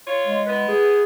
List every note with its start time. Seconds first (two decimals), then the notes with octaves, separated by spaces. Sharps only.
0.06 F4 C#5
0.27 G#3
0.46 B3 E4 B4
0.69 G#4